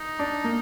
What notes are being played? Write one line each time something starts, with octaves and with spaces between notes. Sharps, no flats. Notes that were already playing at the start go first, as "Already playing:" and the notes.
Already playing: D#4
D4
A#3